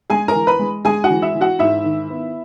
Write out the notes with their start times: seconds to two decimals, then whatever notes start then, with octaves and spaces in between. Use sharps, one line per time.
0.10 G#3 G#4 G#5
0.28 A#4 A#5
0.35 E3
0.47 B4 B5
0.59 G#3
0.85 G#3 G#4 G#5
1.04 F#4 F#5
1.10 E3
1.22 E4 E5
1.35 E3
1.41 F#4 F#5
1.59 G#2 E4 E5
1.84 D#3
2.10 B3